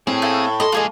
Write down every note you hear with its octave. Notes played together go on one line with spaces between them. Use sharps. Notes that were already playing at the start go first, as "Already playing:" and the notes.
A2 C4 G#4 G#5
A3 A#3 A4
D#2 A4 A#4 D#5 C6
G#3 A#3 F4 G#4 D#5